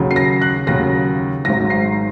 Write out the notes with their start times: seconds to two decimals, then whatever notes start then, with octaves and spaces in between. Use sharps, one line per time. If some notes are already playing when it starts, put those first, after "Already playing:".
Already playing: D#2 C#3 F#3
0.11 C7
0.16 A#6
0.42 F#6
0.67 D#2 C#3 F#3 A#6
1.45 G#1 G#2 F#3 A#6
1.70 C7